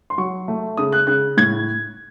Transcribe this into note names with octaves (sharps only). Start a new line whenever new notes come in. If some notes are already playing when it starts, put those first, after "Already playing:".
C6
F#3 C#6
A3
C#3 D#6
F#6
C#3 F#6
A2 G#6